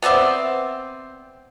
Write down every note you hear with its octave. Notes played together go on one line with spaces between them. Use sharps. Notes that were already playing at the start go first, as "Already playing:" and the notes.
B3 C4 D5 E5